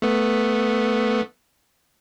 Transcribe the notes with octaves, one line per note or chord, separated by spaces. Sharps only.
A3 B3